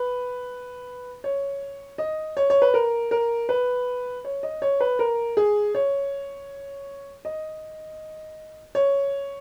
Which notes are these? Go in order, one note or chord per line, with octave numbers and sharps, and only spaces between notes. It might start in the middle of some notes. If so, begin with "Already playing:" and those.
Already playing: B4
C#5
D#5
C#5
C#5
B4
A#4
A#4
B4
C#5
D#5
C#5
B4
A#4
G#4
C#5
D#5
C#5